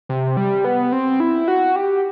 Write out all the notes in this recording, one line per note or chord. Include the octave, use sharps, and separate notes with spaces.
C3
G3
B3
C4
E4
F#4
G4